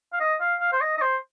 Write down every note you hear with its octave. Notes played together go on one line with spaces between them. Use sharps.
F5
D#5
F5
F5
C5
D#5
D#5
C5